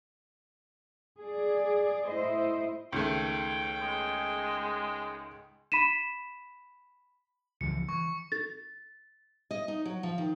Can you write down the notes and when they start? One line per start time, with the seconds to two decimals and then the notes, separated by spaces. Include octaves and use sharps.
1.19 G#4 D5
2.07 A2 E4 C5 D#5
2.92 C#2 D#3 A3 G5
3.81 G#3
5.72 B5 B6 D#7 E7
7.61 C#2 E3 F3 C#7
7.89 E3 C#6
8.32 A6
9.51 D#5
9.68 D#4
9.85 F#3
10.03 F3
10.18 D#3